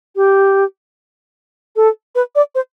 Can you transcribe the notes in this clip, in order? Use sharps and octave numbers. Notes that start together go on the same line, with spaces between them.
G4
A4
B4
D5
C5